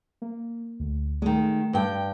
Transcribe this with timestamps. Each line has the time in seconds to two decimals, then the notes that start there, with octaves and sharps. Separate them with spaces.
0.22 A#3
0.80 D2
1.22 D#3 G#3 A3
1.73 G2 B4 G5